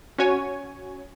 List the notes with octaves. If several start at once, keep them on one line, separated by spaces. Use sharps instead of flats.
C#4 F#4 C#5 G#5